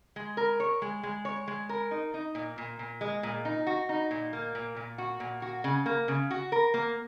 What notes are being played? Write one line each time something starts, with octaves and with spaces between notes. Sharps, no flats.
G#3
A#4
C#5
G#3
G#3
C#5
G#3
A#4
D#4
D#4
A#2
A#2
A#2
G#3
A#2
D#4
F#4
D#4
A#2
A#3
A#2
A#2
F#4
A#2
F#4
C#3
A#3
C#3
F#4
A#4
A#3